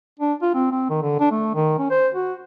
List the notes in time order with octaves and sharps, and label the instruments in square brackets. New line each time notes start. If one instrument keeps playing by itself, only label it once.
[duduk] D4
F4
C4
C4
D#3
D3
D4
A3
D#3
C#4
C5
F#4